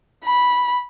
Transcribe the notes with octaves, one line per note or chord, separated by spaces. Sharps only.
B5